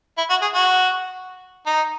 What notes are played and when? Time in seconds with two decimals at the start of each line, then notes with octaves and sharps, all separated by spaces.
0.18 E4
0.30 F#4
0.42 G#4
0.54 F#4
1.66 D#4